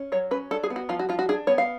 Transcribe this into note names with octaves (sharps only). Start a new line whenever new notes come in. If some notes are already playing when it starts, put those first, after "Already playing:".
Already playing: C#4
F#3 C#5
C#4 B4
D4 A4
G#4
B3
F#4
F3 F4
F#4
F3 F4
F#4
D4 G#4
B3 C#5
F5